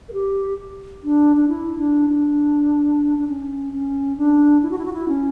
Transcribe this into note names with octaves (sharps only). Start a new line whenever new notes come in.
A#4
G4
D4
D4
E4
D4
D4
D4
C#4
C#4
D4
E4
F#4
E4
F#4
E4
C#4